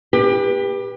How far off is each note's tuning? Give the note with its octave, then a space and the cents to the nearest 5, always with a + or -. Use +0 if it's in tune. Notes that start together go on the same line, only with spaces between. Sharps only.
G4 +25 B4 -20